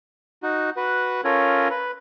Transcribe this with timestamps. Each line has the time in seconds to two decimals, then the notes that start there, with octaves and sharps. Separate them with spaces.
0.43 D#4 F#4
0.77 F#4 B4
1.24 C#4 F4 A4 A#4 C#5
1.70 B4